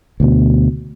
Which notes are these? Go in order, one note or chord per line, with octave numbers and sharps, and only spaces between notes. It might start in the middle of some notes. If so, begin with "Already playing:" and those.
D2 B2